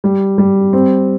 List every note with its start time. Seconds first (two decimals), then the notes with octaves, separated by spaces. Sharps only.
0.04 G3
0.38 G3
0.73 C4